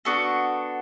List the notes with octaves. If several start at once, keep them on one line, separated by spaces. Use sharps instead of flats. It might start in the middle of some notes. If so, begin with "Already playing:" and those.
B3 D4 F#4 A4